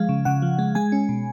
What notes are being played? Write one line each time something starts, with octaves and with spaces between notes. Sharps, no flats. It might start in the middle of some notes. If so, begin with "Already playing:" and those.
Already playing: F3 G#3 F5
C#3
C#3 F#5
F3
G#3
G#3 G#5
C#4
B2